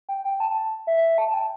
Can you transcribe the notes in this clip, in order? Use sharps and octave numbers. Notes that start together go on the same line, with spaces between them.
G5
G5
A5
E5
A5
G5